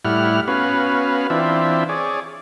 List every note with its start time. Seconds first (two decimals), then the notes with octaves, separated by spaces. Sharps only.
0.05 A2 G3 E4 F#5 F6
0.48 B3 C#4 F#4 B4 F5
1.30 E3 C4 D4 F4 E5
1.89 G#4 C#5 D5